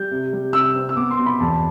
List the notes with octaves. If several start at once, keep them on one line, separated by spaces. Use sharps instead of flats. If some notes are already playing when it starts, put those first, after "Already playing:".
Already playing: G3 G6
C3
G3
C3 E6
C4
E6
B3 D6
C6
B2
B5
E2 A5